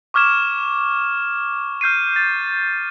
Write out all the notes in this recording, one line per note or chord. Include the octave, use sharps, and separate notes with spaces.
C#6 D6 F6 G#6 E7
F6 G6 C7 D#7
A6